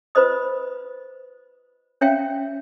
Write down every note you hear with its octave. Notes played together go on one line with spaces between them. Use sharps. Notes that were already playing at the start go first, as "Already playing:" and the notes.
F4 B4 C5 D#5 D#6
C#4 C#5 E5 F5 G5